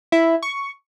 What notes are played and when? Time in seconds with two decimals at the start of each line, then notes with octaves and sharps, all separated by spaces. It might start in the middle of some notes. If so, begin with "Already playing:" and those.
0.12 E4
0.43 C#6